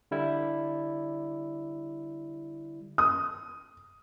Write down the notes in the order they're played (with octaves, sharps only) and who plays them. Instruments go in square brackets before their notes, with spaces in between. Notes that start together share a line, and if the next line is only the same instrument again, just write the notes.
[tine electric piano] D3 G3 E4
[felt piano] D#6